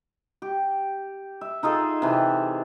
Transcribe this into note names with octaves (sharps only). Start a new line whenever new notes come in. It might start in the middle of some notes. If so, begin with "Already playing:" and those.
G4
E5
D#4 F4 G#4 A4
C3 E3